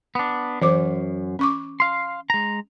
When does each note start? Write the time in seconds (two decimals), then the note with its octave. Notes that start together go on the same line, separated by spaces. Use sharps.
0.15 B3 D4
0.62 F#2 E3 C5 D6
1.39 C#4 C#6 D6
1.80 F5 C6
2.30 G#3 A#5